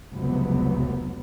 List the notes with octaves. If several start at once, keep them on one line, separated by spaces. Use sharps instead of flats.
F1 C#2 C3 F#3 B3